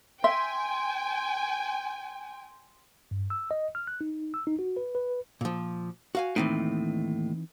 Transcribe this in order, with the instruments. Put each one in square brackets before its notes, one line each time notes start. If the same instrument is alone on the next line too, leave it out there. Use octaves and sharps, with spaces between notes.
[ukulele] E5 [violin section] G5 G#5 [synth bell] C6
[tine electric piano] G2
E6
D#5
F6
F#6
D#4
E6
D#4
F#4
B4
B4
[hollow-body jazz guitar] A#2 F3
F#4 F5 G#5
[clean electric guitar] D#2 A2 [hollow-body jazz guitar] E3 C4 D#4